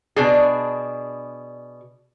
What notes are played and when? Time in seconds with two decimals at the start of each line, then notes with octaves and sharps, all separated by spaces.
0.16 B2 D4 G#4